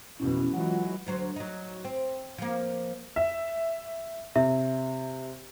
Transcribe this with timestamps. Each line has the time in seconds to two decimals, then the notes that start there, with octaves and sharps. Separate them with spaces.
0.20 F2 B2 E3 C#4 E4
0.53 E3 F#3 G#3 F4 F#5
1.07 D2 F#3 C5
1.36 F#3 D#4
1.85 C4
2.38 F3 A#3
3.16 E5
4.36 C3 E5